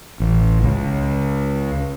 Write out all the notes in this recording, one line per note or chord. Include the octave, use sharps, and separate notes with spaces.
A1
C#2